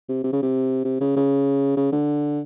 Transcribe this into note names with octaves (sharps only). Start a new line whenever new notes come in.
C3
C3
C#3
C3
C3
C#3
C#3
C#3
D3